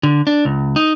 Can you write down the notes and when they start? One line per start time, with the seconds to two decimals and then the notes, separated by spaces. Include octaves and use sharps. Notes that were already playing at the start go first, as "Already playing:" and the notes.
0.03 D3
0.27 D4
0.45 C#2
0.76 D#4